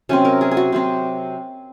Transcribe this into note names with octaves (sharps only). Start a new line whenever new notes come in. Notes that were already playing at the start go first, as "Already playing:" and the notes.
C3 F#3 C4 C#4
A#4
G#4
G#4
F#4
C3 F#3 C4